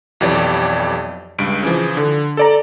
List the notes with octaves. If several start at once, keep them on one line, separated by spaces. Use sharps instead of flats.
B1 F2 E3 G4 C#5 D5
C#2 G2 D7
C#3 E3 F3
D3
A4 D5 A#5